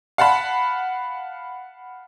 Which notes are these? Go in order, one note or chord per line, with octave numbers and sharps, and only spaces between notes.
F5 F#5 A5 B5